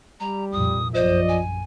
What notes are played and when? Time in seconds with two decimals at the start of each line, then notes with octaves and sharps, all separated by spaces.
0.20 G3 A#5
0.52 C2 F2 A#2 D#6
0.94 A#1 F#2 F3 C5 D5 D#5
1.29 G#5